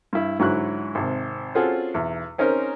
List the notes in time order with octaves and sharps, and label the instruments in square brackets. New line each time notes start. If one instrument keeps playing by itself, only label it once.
[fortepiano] G2 E4
G#2 D3 F#3 E4 C#6 F#6
G#1 C3
C4 C#4 F4 F#4 G#4 A4
B1 E2
C4 C#4 D#4 G#4 A#4 C5